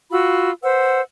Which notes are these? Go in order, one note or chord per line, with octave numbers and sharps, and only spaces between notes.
F4 F#4 B5 E6
B4 C5 F#5 E6